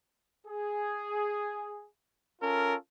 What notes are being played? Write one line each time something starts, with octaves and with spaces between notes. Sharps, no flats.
G#4
C#4 F4 A4 A#4